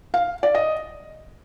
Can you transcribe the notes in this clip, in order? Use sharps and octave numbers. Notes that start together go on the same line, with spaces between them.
F5
D5
D#5